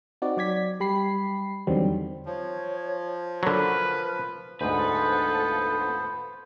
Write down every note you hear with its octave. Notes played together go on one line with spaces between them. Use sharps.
C4 D#4 F#4 D5
F#3 D5 G#6 B6
G3 G4 B5 B6 C7
E2 D3 D#3 F#3 G3 C4
F3 C#5
D3 F#3 A#4 B4
D2 G#2 B3 F4 A4 B4 C5